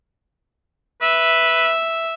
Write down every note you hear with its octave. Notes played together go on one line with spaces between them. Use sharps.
B4 E5